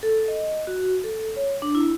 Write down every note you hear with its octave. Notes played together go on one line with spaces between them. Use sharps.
A4
D#5
F#4
A4
C#5
D4
E4